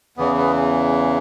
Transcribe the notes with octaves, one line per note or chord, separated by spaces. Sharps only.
E2 C#3 E3 B3
B3